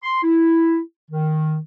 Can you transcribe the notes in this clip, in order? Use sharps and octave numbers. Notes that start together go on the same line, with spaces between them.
C6
E4
D#3